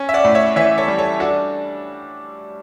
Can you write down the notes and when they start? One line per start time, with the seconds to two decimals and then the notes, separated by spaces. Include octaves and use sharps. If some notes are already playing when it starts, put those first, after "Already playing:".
Already playing: C#4
0.09 E5
0.14 D5 F#5
0.25 A2
0.35 C#5 E5
0.56 E3 C#5 E5
0.78 A4 C#5
0.88 G3
0.98 A4 C#5
1.20 D4 F#4 A4